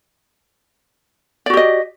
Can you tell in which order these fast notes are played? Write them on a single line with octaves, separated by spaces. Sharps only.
D5 F#4 G4 D#5